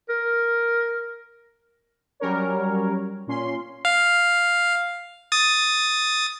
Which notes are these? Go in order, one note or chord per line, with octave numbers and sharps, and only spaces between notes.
A#4
F#3 G3 C#4 A#4 C#5
A#2 C#4 C6
F5
D#6 A6